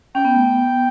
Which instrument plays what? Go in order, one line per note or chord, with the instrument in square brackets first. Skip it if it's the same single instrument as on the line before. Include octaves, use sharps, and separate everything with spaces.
[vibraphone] C#4 [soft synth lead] G5
[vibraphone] B3
A3
B3